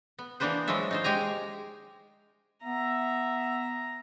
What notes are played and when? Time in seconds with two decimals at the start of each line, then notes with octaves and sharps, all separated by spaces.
0.19 B3
0.40 E3 A#3 B3 D4 B4 C5
0.67 F3 F#3 G#3 F4 E5
0.91 D#4 F4 C5
1.04 G#3 G4 G#5 A#5
2.64 B3 E5 A#5